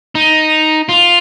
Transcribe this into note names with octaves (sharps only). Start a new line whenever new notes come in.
D#4
F4